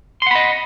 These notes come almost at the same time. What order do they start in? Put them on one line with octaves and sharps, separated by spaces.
C6 F#5 B5 D#5